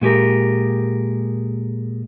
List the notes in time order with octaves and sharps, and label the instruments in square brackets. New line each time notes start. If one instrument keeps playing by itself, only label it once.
[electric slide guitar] A#2 G#3 G4 A#4